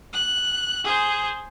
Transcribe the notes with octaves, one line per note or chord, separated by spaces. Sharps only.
F#6
G#4 C5